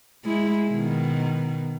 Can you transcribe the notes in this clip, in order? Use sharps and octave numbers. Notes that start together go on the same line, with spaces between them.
G#3 E4
B2 D#3